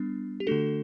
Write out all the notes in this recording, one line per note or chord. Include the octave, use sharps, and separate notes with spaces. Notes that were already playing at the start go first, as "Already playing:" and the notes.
Already playing: G3 B3 D4
G4
D3 A3 D4 F#4 A4